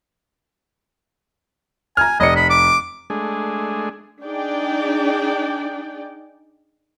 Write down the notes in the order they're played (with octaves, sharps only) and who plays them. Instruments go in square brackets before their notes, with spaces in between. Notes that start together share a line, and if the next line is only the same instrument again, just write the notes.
[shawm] G#5 [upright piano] A#5 F6
[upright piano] F1 D5 C#7 [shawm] D#5
[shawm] B5
D6
[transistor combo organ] G#3 A3 D4 G#4
[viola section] D4 D#4 G#4 D5 G5